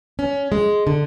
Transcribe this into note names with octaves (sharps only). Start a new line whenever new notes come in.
C#4
G#3
D3